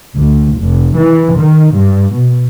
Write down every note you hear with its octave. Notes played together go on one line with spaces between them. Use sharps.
D2
F1
E3
D#3
G2
B2